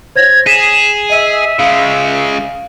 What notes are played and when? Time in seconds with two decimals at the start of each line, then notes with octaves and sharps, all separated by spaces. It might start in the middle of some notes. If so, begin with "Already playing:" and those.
0.16 C5 C#5 G#6 A#6
0.47 G#4 B6 E7
1.10 D#5 E5 D#7
1.59 C#3 G#3 F5